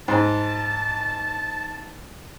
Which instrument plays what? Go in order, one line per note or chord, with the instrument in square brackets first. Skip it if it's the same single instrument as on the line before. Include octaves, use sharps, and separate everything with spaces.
[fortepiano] G#2 [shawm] A5